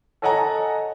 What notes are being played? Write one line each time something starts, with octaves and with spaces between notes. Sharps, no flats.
A4 C#5 D#5 F#5 G#5 A#5